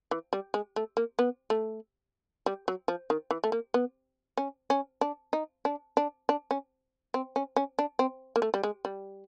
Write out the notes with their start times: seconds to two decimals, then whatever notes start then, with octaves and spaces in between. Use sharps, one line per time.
0.11 E3
0.33 G3
0.54 G#3
0.76 A3
0.97 A#3
1.19 B3
1.50 A3
2.46 G3
2.68 F#3
2.88 F3
3.10 D#3
3.31 E3
3.44 A3
3.52 A#3
3.74 B3
4.37 C#4
4.70 C#4
5.01 D4
5.33 D#4
5.65 D4
5.97 D4
6.29 D4
6.51 C#4
7.14 C4
7.36 C#4
7.56 C#4
7.79 D4
7.99 C4
8.36 A#3
8.42 A3
8.54 G3
8.63 G#3
8.85 G3